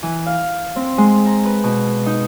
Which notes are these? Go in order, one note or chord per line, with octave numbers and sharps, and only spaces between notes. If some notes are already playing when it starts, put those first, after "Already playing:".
E3
F5
C4
G#3
A#5
B4
B2
D#4